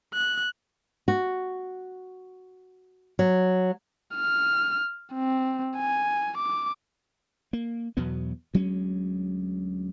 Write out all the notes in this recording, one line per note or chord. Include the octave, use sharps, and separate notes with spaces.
F#6
F#4
F#3
F6
C4
G#5
D6
A#3
E2 B2 F#3 B3
D2 F#3 G#3 C#4